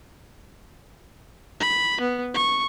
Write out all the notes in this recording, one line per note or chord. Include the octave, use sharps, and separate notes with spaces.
B5
B3
C#6